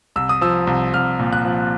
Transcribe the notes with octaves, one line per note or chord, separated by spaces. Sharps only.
C2 E6
D#6
F3 E6
C2
C2 F6
A#2
F#6
F3